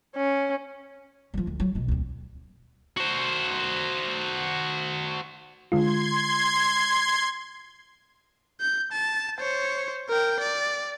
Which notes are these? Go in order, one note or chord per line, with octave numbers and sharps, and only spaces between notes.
C#4
F3 G3
D2
F#3
B1 D#3
D2 C4
F#4 C5
D3 G#3 F4 C6 G#6
G6
A5
C5 C#5
A#4 G5
D5